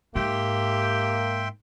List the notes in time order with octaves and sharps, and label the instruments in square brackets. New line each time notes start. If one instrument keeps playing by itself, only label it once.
[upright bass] G#2 [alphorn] A#3 [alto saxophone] G4 [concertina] E5 G5 C6